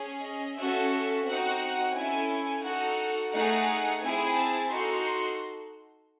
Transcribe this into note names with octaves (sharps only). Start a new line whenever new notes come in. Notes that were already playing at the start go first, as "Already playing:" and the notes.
Already playing: C#4 G#4
D#5
C#4 F#4 A4 E5
C4 D#4 F#4 F#5
C#4 E4 A4 G#5
D#4 F#4 A4 F#5
A3 D#4 G#4 F#5
C4 E4 G#4 G#5
A5
D#4 F#4 A4 C6